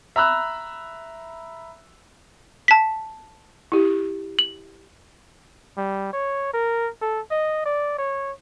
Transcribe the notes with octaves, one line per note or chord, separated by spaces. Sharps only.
E5 A#5 B5 E6 F#6
A5 B6
E4 G4
F#7
G3
C#5
A#4
A4
D#5
D5
C#5